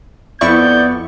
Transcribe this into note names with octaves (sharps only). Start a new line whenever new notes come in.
F2 B3 E4 D5 C#6 G6